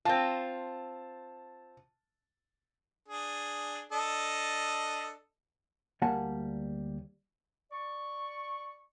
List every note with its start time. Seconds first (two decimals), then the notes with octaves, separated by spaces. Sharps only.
0.05 C4 F4 A5
3.08 D4 G#4
3.92 D4 A4 D#5
6.02 D2 G3 A#3 F#5 G#5 A5
7.72 D5 C#6